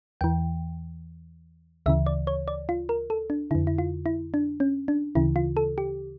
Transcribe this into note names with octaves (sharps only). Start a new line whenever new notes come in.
E2 E3 G5
D2 C#3 E3 E5
D5
C#5
D5
F4
A#4
A4
D4
F2 D3 E4
E4
F4
E4
D4
C#4
D4
D2 C#3 E3 E4
F4
A4
G4